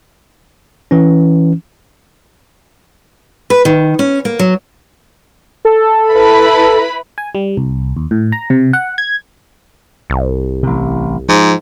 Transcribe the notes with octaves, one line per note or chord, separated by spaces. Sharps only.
E3 C#4
B4
D#3
C#4
A#3
F#3
A4
E4 B4 B5
G#5
G3
C2
D#2
A2
A#5
C3
F#5
G#6
C2
A1 C3
G#2 F3